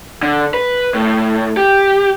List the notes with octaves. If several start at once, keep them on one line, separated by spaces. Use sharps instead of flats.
D3
B4
A2
G4